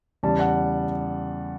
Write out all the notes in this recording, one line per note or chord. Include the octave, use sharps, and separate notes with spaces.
E2 C#3 G3 A5
F#5